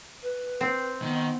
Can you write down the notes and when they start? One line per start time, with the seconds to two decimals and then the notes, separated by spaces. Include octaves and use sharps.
0.22 B4
0.61 C4
1.02 D#3 B3